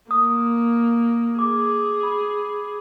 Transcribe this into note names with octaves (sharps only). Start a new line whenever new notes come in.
A#3 D#6
G#4 D6
B5